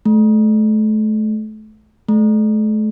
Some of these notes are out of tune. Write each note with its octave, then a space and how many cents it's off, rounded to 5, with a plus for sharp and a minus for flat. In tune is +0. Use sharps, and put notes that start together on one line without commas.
A3 -35
A3 -40